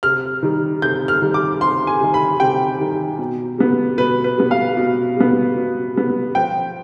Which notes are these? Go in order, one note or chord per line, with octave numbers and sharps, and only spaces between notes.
C3 F6
D#3 G3
C3 G6
F6
D#3 G3
D6
C3 C6
G#5
D#3 G3
B5
C3 G5
D#3 G3
B2
G3 B3
B2 B4
B4
G3 B3
F5
B2
G3 B3
B2
G3 B3
F3 G5